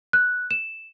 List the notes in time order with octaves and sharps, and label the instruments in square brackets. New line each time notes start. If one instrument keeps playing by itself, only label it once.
[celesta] F#6
E7